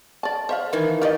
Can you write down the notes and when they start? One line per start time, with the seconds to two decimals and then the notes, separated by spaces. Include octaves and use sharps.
0.23 D5 A5
0.49 C5 E5 F5
0.73 D#3 E3
1.01 G4 D5 D#5 F5